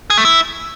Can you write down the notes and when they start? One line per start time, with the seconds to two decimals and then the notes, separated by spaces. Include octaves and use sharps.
0.10 G#4
0.18 A3
0.25 E4